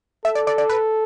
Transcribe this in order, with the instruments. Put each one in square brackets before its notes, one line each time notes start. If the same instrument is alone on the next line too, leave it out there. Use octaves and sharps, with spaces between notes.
[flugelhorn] A4 [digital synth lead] E5
[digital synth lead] D5
D5
D5
B4